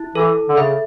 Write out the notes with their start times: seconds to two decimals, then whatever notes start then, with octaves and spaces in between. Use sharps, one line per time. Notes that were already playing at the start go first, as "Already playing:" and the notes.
Already playing: E4
0.15 E3 A4
0.49 D3
0.57 C#3 E5